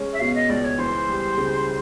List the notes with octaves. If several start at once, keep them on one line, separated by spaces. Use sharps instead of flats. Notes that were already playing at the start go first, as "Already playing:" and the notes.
Already playing: G#3 C#4
E5
B2 F5
D#5
C#2 D5
C#5
E3 C5
G3
C#3